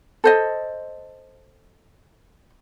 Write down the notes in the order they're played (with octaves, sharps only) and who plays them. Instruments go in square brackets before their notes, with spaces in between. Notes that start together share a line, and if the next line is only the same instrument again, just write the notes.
[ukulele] A4 C5 D#5